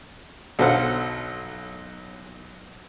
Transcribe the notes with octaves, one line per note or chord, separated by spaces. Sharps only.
B1 F#3 A4 C5 F5 F#5